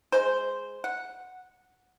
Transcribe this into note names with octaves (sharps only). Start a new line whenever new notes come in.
G#3 C5
F#5